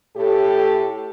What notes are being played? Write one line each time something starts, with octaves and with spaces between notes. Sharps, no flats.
A2 G4 A4